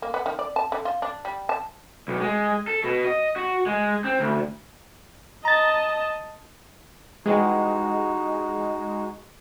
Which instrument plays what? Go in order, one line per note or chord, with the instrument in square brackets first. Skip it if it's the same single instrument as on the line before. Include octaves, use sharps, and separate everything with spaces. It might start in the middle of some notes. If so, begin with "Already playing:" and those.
[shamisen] A#3
B3
D#3
D5
A5
D3
F4
D4
G3
A5
[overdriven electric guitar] B1
G#3
A4
B2
D#5
F#4
G#3
C4
D2
[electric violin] D#5 A5 [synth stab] A#5 A6
[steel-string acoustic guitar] E3 G3 F#5 [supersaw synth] G#3 [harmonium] D#4 F#4